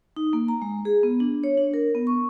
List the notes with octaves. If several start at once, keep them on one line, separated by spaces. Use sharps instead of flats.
D#4
A#3
A#5
G#3
G#4
B3
D4
C#5
D4
A#4
B3
C#6